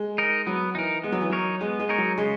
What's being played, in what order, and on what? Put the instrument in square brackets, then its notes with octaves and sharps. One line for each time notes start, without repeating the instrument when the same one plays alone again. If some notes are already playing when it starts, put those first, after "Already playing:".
Already playing: [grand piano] G#3
[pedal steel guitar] D#4 A#4
[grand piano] F#3 [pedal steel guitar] B3
[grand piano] E3 [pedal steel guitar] D#4 A#4
[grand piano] G#3 [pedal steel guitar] B3
[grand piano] F#3
E3
[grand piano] F#3 [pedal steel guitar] D#4 A#4 C#5
[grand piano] G#3 [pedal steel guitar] B3
[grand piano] G#3
[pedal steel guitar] D#4 A#4 C#5
[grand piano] F#3
[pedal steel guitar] C#3 [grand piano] G#3